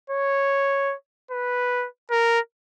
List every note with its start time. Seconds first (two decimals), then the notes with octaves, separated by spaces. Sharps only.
0.10 C#5
1.31 B4
2.11 A#4